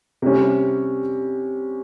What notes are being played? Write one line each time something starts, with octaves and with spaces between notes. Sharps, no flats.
C3 G3 C#4